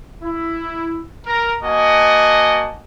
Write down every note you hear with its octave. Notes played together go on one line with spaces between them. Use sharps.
E4
A#4
A#3 F#4 D#5 F#5 G#5 A5